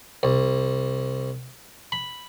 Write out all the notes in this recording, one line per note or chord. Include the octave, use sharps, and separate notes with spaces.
C2
B5